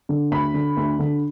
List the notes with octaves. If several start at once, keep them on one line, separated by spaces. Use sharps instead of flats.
D3
D2 B5
D3
D2
D3